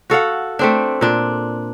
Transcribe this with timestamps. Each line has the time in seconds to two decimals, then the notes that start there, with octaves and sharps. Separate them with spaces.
0.10 F#4 A4 F5 F#5
0.59 A3 C4 D4
1.01 A#2 D4